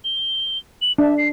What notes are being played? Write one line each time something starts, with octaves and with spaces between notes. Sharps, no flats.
G7
F#7
D4 E5
C7